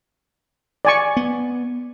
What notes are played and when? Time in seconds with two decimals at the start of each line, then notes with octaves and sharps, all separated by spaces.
0.85 D5 G#5 C#6
1.16 B3